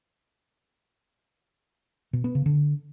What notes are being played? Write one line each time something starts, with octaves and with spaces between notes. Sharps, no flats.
B2
B3
C#3
D3